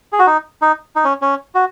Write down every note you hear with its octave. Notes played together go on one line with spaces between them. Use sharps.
G#4
F#4
D#4
D#4
D#4
C#4
C#4
F#4